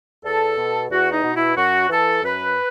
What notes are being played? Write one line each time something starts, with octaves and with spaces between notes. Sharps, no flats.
E2 A4
B2
E2 F#4
D#4
B2
E4
F#2 F#4
E3 A4
F#2 B4